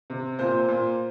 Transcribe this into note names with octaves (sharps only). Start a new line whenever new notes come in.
C3
A#2 C5
A#2